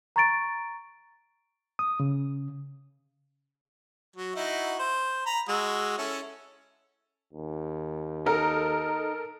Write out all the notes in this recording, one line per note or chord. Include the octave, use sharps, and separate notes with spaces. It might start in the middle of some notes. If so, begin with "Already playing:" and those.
A#5 C#6 A6 D7
D#6
C#3
F#3
D#4 E4 F#4
C5
A#5 B5
G#3 F#4 E6
C#4 E4 A4
D#2
D#4 A4 A#4